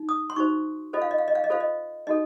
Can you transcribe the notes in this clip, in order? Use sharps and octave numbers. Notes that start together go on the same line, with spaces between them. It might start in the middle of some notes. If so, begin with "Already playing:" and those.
Already playing: D#4
D#6
C6
D#4 F#4 C5 C#6
F4 A4 C5 D#5
F5
D#5
F5
D#5
F5
D#5
F4 A4 C5 F5
D#5
D#4 F#4 A4 D#5